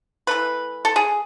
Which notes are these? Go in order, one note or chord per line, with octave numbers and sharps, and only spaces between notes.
E3 A3 B4
A4
G#4